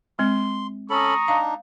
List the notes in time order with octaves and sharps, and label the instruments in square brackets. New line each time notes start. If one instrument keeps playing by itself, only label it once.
[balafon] G#3 C4 [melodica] C6
[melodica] C#4 A4 B5 [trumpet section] A#5 C#6 D#6
[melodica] D4 D#4 [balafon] F5